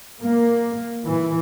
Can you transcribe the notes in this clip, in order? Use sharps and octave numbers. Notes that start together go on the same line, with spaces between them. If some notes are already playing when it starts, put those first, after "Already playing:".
A#3
E3